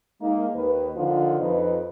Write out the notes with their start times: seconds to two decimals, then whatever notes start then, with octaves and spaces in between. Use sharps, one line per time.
0.21 G#3 A#3 D#4
0.55 D#2 D#3 B4
0.96 D3 D#3 F3 F4
1.40 F2 D#4 B4